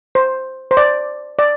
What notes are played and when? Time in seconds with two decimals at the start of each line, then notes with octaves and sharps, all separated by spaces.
0.15 C5
0.71 C5
0.77 D5
1.39 D5